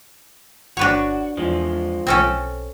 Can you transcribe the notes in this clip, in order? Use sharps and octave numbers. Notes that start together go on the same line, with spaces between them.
G1 D4 F#4 B4 C#5
E2 F3 G#3
B1 C4 C#4 A4